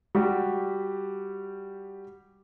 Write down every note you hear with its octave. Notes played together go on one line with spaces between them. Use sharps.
G3 F#4 G4